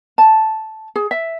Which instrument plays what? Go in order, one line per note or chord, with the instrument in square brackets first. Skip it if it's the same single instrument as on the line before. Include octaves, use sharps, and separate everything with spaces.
[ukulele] A5
G#4
E5